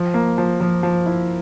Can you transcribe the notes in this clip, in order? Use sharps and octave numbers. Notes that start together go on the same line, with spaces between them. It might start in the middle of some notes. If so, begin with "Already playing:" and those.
Already playing: F3
A#3
F3
F3
F3
E4